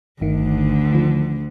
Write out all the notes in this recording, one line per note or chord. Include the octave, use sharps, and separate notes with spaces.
G1 D2 D3 D#3
D#3 F3